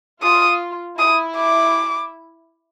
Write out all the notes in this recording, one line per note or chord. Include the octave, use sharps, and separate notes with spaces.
F4 D#6
E4 D#6
D6